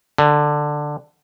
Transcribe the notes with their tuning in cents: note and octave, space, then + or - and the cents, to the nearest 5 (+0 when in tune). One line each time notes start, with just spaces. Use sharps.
D3 +10